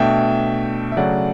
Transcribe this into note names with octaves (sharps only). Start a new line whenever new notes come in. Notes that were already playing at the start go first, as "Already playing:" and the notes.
Already playing: B2 A3 D4 E5 G5
E5
C#3 F#3 A3 D5 F#5